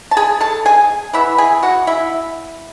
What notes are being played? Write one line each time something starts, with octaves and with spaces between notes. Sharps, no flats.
A5
G#4 G#5
A4 A5
G#4 G#5
E3 B3 E4 E5
G#4 G#5
F#4 F#5
E4 E5